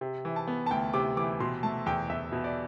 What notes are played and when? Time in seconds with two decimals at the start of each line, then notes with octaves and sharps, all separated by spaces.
0.01 C3
0.25 E3
0.36 A5
0.47 B3
0.66 A5
0.71 D2 G5
0.94 C3 D6
1.17 E3 D6
1.40 B2 C6
1.63 A3 A5
1.86 E2 G5
2.09 E2 E5
2.32 B2
2.44 D5